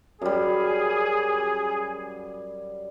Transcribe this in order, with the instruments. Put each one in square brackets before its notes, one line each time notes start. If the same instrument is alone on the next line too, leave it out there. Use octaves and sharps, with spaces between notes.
[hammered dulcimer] F#2 G3 [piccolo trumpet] G#4